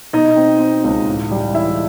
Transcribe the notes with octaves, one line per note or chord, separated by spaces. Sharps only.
B2 D#4 D#5
C4
C4
C#2
A1
G3
E3 E4 E5